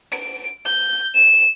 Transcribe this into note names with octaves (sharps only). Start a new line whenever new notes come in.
D7
G6
E7